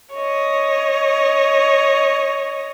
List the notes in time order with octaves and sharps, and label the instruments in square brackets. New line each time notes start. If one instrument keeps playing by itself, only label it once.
[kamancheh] C#5 D#5